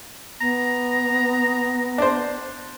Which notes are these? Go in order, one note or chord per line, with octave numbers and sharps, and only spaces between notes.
B3 A#5
D4 C5